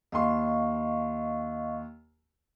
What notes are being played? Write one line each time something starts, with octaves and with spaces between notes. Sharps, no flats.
D#2 D#5 F5 C6 C#6